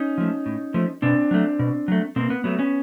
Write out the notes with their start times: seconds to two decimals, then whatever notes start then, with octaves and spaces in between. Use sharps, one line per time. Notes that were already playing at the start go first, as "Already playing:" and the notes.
Already playing: C#4 D#4
0.18 F3 A3
0.46 A2
0.74 F3 A3
1.02 B2 C4 D4
1.31 F#3 A3
1.59 B2
1.88 F#3 A3
2.16 B2 A#3 C4
2.30 B3
2.44 F#3 A3 B3
2.59 B3 C#4